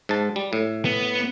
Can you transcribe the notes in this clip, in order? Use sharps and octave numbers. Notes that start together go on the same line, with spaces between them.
G#2 A5
G3
A2
B3